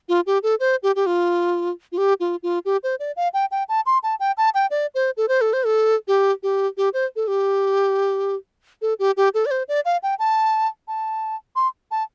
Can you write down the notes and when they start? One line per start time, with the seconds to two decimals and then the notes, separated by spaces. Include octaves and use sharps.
0.09 F4
0.26 G4
0.43 A4
0.60 C5
0.83 G4
0.96 G4
1.06 F4
1.92 F4
1.98 G4
2.20 F4
2.43 F4
2.65 G4
2.83 C5
3.00 D5
3.16 F5
3.34 G5
3.51 G5
3.69 A5
3.86 C6
4.03 A5
4.20 G5
4.38 A5
4.54 G5
4.71 D5
4.95 C5
5.17 A4
5.28 C5
5.41 A4
5.53 C5
5.66 A4
6.08 G4
6.43 G4
6.77 G4
6.94 C5
7.16 A4
7.28 G4
8.82 A4
8.99 G4
9.17 G4
9.34 A4
9.46 D5
9.51 C5
9.68 D5
9.85 F5
10.03 G5
10.19 A5
10.88 A5
11.56 C6
11.91 A5